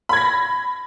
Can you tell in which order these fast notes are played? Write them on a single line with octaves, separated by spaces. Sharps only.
B5 G#6 A#6